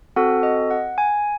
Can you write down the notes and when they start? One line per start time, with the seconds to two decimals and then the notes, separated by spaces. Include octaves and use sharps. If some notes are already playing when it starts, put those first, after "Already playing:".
0.16 C4 F#4 A4 F#5
0.43 D#5
0.71 F#5
0.98 G#5